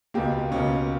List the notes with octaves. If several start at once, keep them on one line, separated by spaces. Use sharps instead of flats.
C#2 B2 A#3 G4
C#2 B2 A#3 C#4